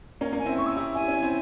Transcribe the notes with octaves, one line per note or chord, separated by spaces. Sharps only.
A#3 C#4
A#3 C#4
G#5
C4 E4
C#6
E6
E4 G4
E4 G#5
C#4
C4 E4